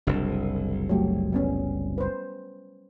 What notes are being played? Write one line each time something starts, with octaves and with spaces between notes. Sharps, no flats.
F#1 C2 D4
F#3 A3 G4
G3 B3 C#4
B4 C5